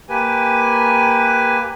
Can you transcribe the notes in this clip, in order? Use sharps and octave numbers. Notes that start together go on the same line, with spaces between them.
A#3 G4 B4 G#5